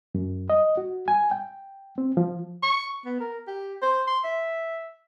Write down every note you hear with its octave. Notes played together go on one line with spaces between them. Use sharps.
F#2
D#5
F#4
G#5
G5
C4
F3
C#6
B3
A#4
G4
C5
C6
E5